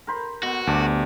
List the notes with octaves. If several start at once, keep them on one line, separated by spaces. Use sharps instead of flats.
A#4 C5 B5
B2 B3 F#4
D2 G2 A5 D6